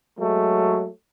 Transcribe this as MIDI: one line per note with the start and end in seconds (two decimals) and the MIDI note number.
0.18 0.87 54
0.18 0.87 56
0.18 0.87 57